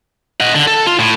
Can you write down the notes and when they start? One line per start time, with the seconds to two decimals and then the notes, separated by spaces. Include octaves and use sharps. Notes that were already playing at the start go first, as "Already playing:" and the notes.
0.40 D#5 F#5
0.55 D3
0.67 A4
0.87 F4
0.99 A2